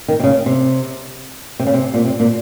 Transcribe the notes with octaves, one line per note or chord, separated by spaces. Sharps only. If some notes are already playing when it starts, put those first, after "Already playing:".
D#3
C3
C#3
C3
C3
C#3
C3
A#2
C3
A#2